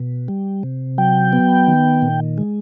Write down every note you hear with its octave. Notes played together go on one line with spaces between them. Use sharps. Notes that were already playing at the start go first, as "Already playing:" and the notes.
Already playing: B2
G3
C3
F#3 G5
B3
D#3
A#2
G#3